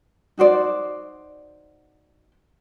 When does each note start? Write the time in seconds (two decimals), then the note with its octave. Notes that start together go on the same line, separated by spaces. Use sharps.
0.38 D#4 F#4 C5 D5